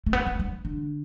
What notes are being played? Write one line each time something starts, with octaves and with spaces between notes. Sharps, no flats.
A3
B3
A3
G3
D3